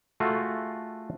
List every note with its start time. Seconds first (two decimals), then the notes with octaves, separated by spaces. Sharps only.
0.20 A3 F4 F#4 G#4 A4